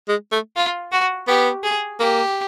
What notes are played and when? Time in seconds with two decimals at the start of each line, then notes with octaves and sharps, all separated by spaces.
0.08 G#3
0.32 A3
0.56 F4
0.92 F#4
1.28 B3 G4
1.64 G#4
2.00 A#3 G4